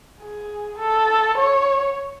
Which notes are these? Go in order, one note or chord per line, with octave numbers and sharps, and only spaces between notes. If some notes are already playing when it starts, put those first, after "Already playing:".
G#4
A4
C#5